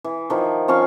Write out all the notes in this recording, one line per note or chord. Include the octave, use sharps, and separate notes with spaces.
E3
D#3 F3
F3 C#4 F5 C#6